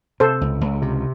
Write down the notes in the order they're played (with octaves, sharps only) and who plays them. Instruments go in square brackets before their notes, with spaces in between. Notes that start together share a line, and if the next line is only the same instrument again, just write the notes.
[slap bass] C3 [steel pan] A4 C5
[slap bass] C#2
C#2
C3